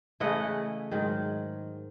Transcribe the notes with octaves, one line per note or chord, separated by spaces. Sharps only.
C#3 E3 A3 E4 D#5 F#5
G#2 D#3 F#3